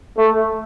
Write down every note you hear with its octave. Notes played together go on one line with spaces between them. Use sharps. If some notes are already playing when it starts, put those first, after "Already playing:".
A3